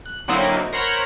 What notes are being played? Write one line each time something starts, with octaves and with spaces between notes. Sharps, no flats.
F#6
D3 F#3 A#3 C4 D#4 E4
A#4 C5 C#5 F#5 A#5 B5